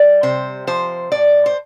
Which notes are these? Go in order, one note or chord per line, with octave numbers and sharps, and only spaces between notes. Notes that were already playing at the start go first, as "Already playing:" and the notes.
Already playing: G3 D5
C3 C5
F3 C5
A2 D5
C5